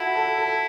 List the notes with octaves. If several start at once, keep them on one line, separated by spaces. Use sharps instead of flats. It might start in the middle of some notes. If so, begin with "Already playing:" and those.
Already playing: E4 F#4 A4
A4
A4